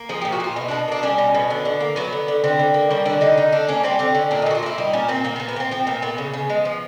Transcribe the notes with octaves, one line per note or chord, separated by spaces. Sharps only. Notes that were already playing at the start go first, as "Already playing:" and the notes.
Already playing: A#3
F3 G#4
A#2 G4
F#4
A#2 F4
B2 E4
B2 D4
A#3 D4
G3 C#4
B2
B2
D3 B3
D3
A#3
F#3 B3
D3
D3
D3 C4
D3
A#3
G3 C#4
D3 D4
D3 D#4
D3 D#4
D3 D4
A#3 C#4
G3 C4
D3 C4
D3 C#4
A#2 D4
D#4
A#2 F#4
F4
A#3 E4
G3 D#4
A#2 C#4
A#2 C4
A#2 A#3
B3
A#2
B3
A#3
C4
F3 C4
A#2 B3
A#2 B3
C#3
C#3
G#3
F3